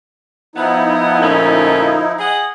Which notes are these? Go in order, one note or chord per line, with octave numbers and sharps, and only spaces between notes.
F3 B3 D#4 E4
D2 A#2 C#4
G#4 D#5 F#5